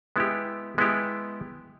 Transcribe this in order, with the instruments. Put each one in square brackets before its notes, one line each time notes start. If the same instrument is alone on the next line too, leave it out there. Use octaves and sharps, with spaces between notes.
[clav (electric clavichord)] G#3 B3 E4 G4
G#3 B3 E4 G4